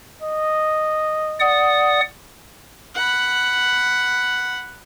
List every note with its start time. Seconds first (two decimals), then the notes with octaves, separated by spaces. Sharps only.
0.22 D#5
1.40 D5 F#5 D#6
2.95 F#5 B5